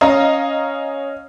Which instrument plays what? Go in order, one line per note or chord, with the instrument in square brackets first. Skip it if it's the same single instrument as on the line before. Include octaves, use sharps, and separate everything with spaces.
[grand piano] C#4 [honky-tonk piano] D#5 F5 A#5